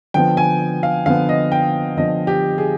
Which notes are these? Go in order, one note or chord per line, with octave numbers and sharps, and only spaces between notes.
D3 F3 B3 G5
G#5
F5
D3 F3 B3 F5
D#5
G5
D3 F3 B3 D#5
G4
G#4